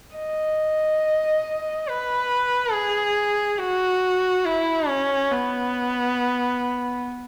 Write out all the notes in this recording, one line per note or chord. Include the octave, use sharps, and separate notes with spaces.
D#5
B4
G#4
F#4
E4
C#4
B3